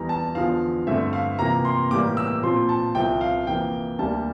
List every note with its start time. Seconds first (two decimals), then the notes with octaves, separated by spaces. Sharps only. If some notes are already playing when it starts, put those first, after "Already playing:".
Already playing: E2 E3 G3 A#5
0.09 A5
0.35 E2 D3 F3 F5
0.87 G2 D3 A3 C4 E5
1.13 F5
1.39 F2 C3 E3 A#3 A#5
1.65 C6
1.91 A2 E3 G3 A#3 D6
2.17 E6
2.43 A#2 F3 C4 C6
2.69 A5
2.95 C2 C3 F3 C4 G5
3.21 F5
3.47 F2 E3 A#3 G5
3.99 D2 D3 G3 A#3 A5